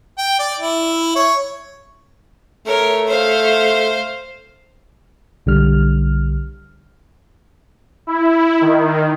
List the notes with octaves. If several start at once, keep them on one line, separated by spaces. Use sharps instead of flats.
G5
D5
E4
C#5
A3 A#4 C#5
C5 F5
B1 D3 G3 F6
E4
D#3